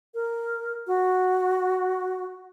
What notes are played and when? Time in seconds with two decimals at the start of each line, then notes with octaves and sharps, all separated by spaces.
0.14 A#4
0.87 F#4